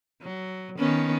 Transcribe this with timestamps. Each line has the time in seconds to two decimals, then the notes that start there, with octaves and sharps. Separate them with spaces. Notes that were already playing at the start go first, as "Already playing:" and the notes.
0.22 F#3
0.78 D#3 B3 C#4